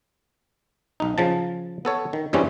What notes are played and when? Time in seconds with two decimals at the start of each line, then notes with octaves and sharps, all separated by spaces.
1.00 B1 D#4
1.18 C#3 F3 A5
1.85 B3 A4 C#5
2.13 D#3
2.33 E2 G2 G3 C4 C#4 E4